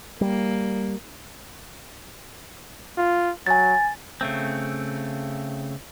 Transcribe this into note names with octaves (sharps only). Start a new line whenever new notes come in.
G3 A#3
F4
F#3 G#5 A6
C#3 A3 C4